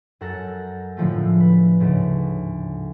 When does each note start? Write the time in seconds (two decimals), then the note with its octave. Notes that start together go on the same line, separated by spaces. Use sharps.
0.21 F#2 A4 A#4 F#5 A#6
0.97 A2 D3 F3 G#3 A3
1.40 B4
1.80 D2 G#2 C#3